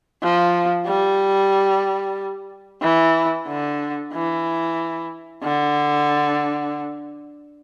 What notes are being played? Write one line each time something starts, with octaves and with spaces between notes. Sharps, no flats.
F3
G3
E3
D3
E3
D3